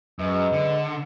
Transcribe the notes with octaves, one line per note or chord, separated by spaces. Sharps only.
F#2 G#3 B4 D#5
D3